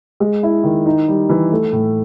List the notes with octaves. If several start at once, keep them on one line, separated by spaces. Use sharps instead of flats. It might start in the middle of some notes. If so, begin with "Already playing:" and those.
G#3
E4
D#3
D#4
G3
E3
A3
A2